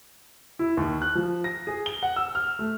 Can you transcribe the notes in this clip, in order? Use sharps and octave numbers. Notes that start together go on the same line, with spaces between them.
E4
D#2
F#6
F3
A#6
G#4
G7
F#5
E6
F6
A3